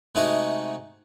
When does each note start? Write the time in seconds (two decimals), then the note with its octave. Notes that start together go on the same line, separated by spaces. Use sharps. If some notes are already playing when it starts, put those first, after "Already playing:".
0.15 C3 G#3 A3 D#4 F#4 A#5